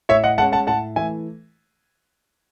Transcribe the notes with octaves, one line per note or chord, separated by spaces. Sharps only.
A2 C#5 E5
D#5 F#5
G#3 C#4 F#5 A5
F#5 A5
A2 F#5 A5
E3 A3 E5 G#5